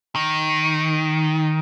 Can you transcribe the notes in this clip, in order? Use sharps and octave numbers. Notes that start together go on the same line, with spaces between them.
D#3